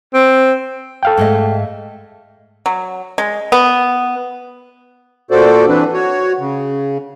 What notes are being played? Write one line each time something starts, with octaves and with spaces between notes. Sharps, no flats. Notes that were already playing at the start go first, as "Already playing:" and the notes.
C4
A4 F5 G5
G#2 A3 D#5
F#3
G#3
B3
A#2 F#4 A4 C5 D5
E3 C4 D4 B4
F#4 C#5
C#3